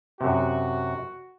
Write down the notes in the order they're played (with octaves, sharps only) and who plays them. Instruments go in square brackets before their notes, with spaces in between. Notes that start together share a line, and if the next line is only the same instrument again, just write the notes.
[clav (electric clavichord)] F#2 C3 [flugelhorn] F#4